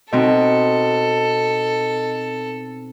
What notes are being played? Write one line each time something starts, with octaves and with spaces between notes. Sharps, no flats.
B2 C4 D#4 A4 D#5